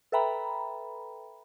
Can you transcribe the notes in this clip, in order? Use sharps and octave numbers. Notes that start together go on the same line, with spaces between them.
A4 B4 E5 G5 A#5 B5